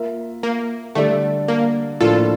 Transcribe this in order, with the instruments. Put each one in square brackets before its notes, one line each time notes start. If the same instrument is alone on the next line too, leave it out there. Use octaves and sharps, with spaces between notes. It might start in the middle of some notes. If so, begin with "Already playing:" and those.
Already playing: [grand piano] A#3 F4 A#4 E5
[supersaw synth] A#3
[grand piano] D3 G3 D4 A4 D5 [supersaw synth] A3
[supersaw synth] A#3
[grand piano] A2 F3 A#3 D4 [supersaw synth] F4 A4